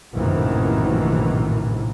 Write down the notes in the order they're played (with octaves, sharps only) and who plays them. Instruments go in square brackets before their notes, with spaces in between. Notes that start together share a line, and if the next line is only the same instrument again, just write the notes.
[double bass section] A#1 F#2 A2 C3 D#3 E3